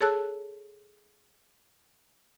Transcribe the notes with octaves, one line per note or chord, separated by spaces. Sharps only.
G#4 A4 C#5 A5 E6 F#6